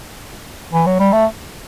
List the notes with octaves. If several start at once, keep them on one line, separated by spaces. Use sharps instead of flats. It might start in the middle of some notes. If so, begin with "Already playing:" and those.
E3
F#3
G3
A3